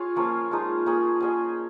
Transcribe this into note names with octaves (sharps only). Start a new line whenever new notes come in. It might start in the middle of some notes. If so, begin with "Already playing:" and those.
Already playing: F4 G#4 C#5 F5
F3 A#3 C#4
F3 G#3 D#4
A#3 C#4 G#4
C#4 G#4 D#5